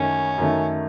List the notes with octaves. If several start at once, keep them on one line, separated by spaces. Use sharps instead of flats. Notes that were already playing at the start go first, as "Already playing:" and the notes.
Already playing: F#2 D#3 A3 C#4
F#2 D#3 A3